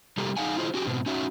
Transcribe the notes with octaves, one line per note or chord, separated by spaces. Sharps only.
C3 G3 G4 A4 A#4
D#4 F#4 G#4 F5 F#5 G#5
F#3 E4 F4 G#4 C5 D#5
C#4 F#4 G4
G#2 B2 B3 C4
C#4 D#4 F#4 E5